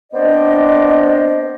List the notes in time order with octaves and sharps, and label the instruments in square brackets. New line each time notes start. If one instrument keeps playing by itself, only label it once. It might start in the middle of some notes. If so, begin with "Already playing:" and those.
[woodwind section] B3 C4 D4 C5 D5 D#5